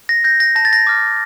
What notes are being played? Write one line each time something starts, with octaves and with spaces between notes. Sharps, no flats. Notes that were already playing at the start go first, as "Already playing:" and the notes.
A#6
G6 A#6
A#6
A5 A#6
A6
A#6
D6 F6